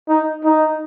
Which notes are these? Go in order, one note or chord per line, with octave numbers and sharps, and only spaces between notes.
D#4
D#4